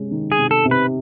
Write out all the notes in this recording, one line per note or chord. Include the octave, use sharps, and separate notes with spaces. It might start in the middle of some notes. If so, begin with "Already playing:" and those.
Already playing: C3 G#3 C#4
D#3
G#4
C3
A4
C3
B4